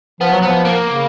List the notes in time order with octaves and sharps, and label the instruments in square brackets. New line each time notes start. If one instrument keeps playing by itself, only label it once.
[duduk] F3 [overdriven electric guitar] B3
[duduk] F#3
[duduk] F3 [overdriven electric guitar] B3
[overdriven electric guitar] A#3
[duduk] C#3